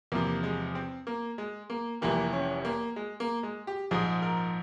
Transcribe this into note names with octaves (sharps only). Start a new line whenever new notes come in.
E2 C3 F3 A#3
G#3
C4
A#3
G#3
A#3
F1 F2 E3 G3 A#3
C#4
A#3
G#3
A#3
G#3
G4
A#1 G#2 F3 G#4
A#4